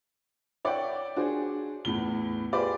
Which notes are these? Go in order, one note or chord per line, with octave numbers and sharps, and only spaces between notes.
C#5 D5 E5 F#5 G5 D6
D4 F#4 G#4 C5
E2 A2 G7
F4 G4 G#4 B4 C5 D5